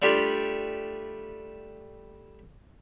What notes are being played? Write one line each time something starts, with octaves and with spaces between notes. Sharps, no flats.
G3 A3 D4 F4 G4